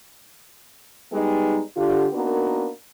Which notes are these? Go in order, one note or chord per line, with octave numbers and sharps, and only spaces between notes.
G3 G#3 B3 D#4
D3 F4 G4
A#3 B3 D4 D#4 F#4 A#4